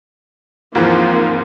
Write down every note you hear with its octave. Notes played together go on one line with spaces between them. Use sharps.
D#2 G#2 E3 F3 A#3 C4